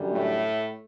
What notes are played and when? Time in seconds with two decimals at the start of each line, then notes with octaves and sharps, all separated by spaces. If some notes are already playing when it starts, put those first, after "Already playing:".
Already playing: F#2 D3 G3
0.10 A2 A3